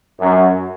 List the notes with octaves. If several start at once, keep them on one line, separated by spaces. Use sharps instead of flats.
F#2